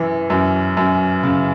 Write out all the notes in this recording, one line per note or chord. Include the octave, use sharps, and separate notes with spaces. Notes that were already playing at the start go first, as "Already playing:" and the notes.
Already playing: F#2 E3
F#2
F#2
C#3